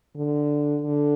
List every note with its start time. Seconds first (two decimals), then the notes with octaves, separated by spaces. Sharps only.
0.16 D3
0.82 D3